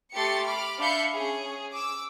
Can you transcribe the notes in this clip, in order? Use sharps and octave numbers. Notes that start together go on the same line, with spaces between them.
A3 G4 C6 A6 C#7
B5 D6 F6
D4 E5 F5 B5 G6 C#7
C#4 G#4
D6 E6